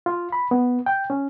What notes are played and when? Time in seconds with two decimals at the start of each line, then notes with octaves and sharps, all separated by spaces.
0.06 F4
0.32 B5
0.51 B3
0.86 G5
1.10 C#4